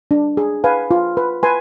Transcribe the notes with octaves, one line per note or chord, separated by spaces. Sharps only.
D4
G#4
B4 F5 G#5
F4
B4
B4 G#5 C6